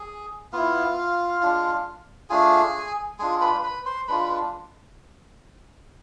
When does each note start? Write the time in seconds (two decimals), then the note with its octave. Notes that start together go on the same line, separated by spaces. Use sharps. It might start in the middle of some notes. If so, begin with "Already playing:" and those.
Already playing: G#4
0.53 B3 E4 F4 F5
1.41 G#3 D4 F4
2.30 A3 D4 F4 G#4 G#5
3.19 G#3 D4 F4 G#4 G#5
3.41 B4 B5
3.63 B4 B5
3.85 C5 C6
4.08 G#3 D4 F4 B4 B5